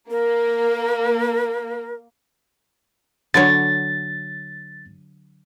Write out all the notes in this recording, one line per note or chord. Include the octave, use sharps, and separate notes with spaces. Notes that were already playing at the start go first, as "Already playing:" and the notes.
A#3 A#4
D3 F#3 C#5 A6